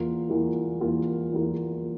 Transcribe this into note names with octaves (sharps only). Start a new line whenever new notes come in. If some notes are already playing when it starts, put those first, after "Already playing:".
Already playing: E2 E3 A#3 F4 A#4
E2 E3 A#3 F4 A#4
E2 E3 A#3 F4 A#4
E2 E3 A#3 F4 A#4